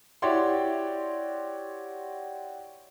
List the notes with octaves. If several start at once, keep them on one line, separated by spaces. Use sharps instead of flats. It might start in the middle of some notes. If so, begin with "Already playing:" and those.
E4 F#4 G4 C#5 D5 C6